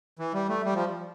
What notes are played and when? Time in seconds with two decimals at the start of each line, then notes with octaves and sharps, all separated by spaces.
0.19 E3
0.34 G3
0.49 A3
0.64 G3
0.75 F3